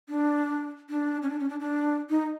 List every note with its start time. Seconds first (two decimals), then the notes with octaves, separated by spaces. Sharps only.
0.09 D4
0.90 D4
1.22 C#4
1.30 D4
1.39 C#4
1.49 D4
1.60 D4
2.10 D#4